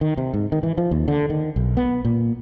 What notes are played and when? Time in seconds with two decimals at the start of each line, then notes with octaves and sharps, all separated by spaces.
0.01 D#3
0.18 C3
0.34 G#2
0.52 D#3
0.63 E3
0.78 F3
0.91 D#2
1.08 D3
1.30 D#3
1.56 B1
1.77 B3
2.05 A#2